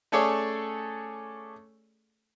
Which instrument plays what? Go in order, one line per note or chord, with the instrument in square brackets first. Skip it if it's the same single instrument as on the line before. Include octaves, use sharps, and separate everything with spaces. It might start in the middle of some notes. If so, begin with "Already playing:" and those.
[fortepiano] A3 C#4 G#4 A4 C#5 D5